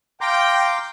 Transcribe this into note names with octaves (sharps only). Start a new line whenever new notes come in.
F5 G5 A#5 C6 D6